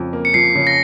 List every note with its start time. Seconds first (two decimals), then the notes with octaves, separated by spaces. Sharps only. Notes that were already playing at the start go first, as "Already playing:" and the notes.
Already playing: F2 C#3 F3
0.13 A#3
0.25 C#7
0.34 F3 C7
0.55 C#3
0.67 A#6